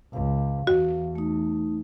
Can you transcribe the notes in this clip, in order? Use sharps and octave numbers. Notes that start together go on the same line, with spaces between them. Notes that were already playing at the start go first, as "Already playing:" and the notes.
C#2 F5
E2 F#4
A3 D#4